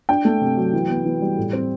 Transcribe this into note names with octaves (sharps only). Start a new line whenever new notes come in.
D4 G5
A3
C3
F#3
E3
B3
E3
G3
A2
C4